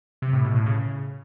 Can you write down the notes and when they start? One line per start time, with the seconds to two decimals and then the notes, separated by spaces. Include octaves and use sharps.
0.22 C3
0.33 A2
0.44 B2
0.55 A2
0.66 C#3